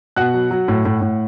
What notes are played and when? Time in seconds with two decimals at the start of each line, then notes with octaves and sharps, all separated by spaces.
0.16 B2 F#5 F#6
0.34 F#3
0.51 F#3
0.68 A2
0.85 A2
1.01 A2